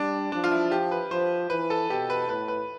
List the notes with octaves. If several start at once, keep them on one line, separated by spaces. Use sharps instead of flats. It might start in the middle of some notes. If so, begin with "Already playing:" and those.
Already playing: G3 D4
F3 D4
F4
E4
G4
B4
F3 C5
E3 B4
A4
B2 G4
B4
A2 B4
B4